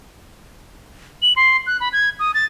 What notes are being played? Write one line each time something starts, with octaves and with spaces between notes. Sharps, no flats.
F#7
C6
F#6
B5
G#6
D#6
A6